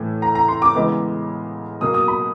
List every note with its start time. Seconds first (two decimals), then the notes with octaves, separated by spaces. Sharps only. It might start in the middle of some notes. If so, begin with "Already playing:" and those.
Already playing: A2 E3 A3
0.22 A#5
0.35 A#5
0.48 C6
0.62 D6
0.75 C#3 E3 G#3 B3
1.81 B2 F#3 A#3 D#6
1.94 D#6
2.08 B5